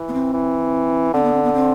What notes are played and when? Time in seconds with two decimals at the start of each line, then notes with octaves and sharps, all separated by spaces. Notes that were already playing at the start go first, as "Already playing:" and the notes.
Already playing: E3
0.08 B3
0.13 C4
0.33 E3
1.13 D3 C4
1.23 B3
1.33 C4
1.43 B3
1.54 C4